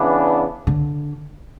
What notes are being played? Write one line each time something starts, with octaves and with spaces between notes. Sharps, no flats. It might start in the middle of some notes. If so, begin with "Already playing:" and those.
Already playing: C#3 E3 B3 D4
D3